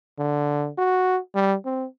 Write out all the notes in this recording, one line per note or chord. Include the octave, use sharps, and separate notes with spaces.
D3
F#4
G3
C4